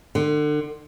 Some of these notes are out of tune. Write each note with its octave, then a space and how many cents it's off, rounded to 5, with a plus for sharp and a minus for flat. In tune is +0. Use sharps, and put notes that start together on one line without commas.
D3 +35